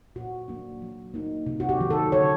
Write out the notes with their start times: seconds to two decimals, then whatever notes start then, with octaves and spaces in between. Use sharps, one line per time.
0.16 A#2 F#4
0.48 F#3 A#3 D4
0.82 F#3
1.14 A#3 D#4
1.46 C3
1.60 F#4
1.69 G4
1.80 D#3 F#3
1.90 A4
2.12 D3 C#5